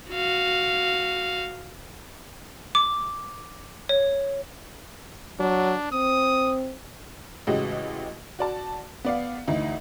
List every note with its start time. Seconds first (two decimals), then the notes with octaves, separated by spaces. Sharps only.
0.11 F#4 F5
2.75 D6
3.89 C#5
5.39 F#3 D4
5.92 C4 D#6
7.47 A1 C#3 G#3 F#4 G4 D#5
8.39 F#4 D5 A5
9.05 B3 D5 F5
9.48 D2 E3 D#4 D#5